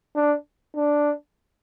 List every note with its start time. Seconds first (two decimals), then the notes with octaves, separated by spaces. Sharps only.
0.16 D4
0.76 D4